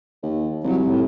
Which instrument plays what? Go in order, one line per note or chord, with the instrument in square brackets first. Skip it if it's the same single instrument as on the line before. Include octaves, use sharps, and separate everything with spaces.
[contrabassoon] D#2
[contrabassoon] C2 [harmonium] F#3
[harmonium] A2